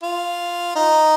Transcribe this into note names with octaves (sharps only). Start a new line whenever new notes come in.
F4
D#4